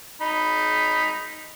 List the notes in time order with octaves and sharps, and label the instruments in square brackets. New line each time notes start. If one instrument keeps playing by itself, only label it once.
[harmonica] D#4 B5